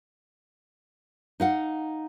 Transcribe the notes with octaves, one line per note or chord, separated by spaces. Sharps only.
D#4 F5 F#5